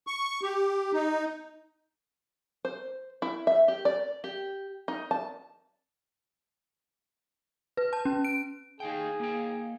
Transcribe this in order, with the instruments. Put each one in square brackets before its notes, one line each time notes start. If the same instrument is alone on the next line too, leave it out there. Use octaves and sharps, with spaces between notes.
[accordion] C#6
G4
D#4
[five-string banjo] C5
E4
E5
G4
D5
G4
D#4
A5
[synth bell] B4
A5
C#4
D7
[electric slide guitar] D#4 F5 G5 [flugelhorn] G#4
[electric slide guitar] A#3 G5